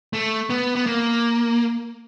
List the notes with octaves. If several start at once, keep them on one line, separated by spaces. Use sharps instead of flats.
A3
B3
B3
A#3